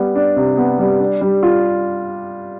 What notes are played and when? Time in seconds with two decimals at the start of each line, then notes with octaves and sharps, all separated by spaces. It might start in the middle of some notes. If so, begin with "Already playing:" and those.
Already playing: G3 B3
0.15 D4
0.36 C3
0.57 B3
0.79 G3
1.00 D4
1.21 G3
1.43 F4